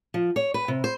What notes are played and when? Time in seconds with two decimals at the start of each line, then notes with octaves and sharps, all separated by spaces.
0.14 F3
0.36 C#5
0.54 B4
0.68 C3
0.84 C5